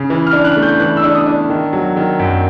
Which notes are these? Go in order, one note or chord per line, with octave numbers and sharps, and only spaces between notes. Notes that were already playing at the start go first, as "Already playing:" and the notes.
Already playing: C#3
E3
F6
D4
F#6
A3
G6
E3 F#6
E6
D4
D#6
D4
D#3
F#3
D#3
F#2